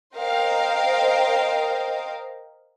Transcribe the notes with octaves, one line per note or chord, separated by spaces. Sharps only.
A#4 C5 D#5 F5 G5